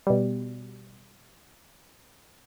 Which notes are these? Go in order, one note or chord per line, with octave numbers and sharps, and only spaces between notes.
B2 G3